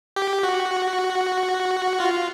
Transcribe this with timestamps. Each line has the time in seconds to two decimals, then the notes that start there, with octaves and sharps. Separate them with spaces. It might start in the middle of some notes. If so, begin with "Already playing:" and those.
0.16 G4
0.43 F#4
2.00 F4